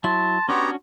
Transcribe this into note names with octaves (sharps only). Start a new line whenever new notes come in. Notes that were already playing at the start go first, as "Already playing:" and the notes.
F#3 E4 A5 C6
B3 C#4 D4 F#4 G4 C#5 A#5